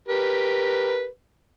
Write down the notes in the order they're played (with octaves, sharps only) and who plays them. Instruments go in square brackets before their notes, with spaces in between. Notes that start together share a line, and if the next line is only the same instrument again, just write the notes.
[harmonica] G4 A#4 B4